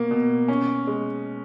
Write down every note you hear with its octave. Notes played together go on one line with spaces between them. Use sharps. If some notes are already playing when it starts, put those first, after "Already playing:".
Already playing: B2 A#3
B2
C#4
G#3